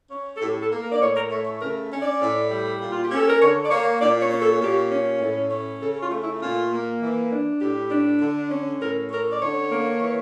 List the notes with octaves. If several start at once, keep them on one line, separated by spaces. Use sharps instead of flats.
C#4
A4
A2 G4
A4
A#3
A#4
D5
A2 C#5
A#4
A3 C#5
C#5
C#3 A#4
C#4
D5
A2
G3
A#2
F4
G4
C#4 A4
A#4
D3 C#5
D5
A#3 C#5
A#2 D5
C#5
C#4
A4
A#2 G4
C#4
A2
C#4
C#3 A4
F4
A3
E4
A#2 F4
A#3
E3
D4
A2 G4
D4
D3
C#4
A2 A#4
C#4 A#4
D5
D3 C#5
A#3
E3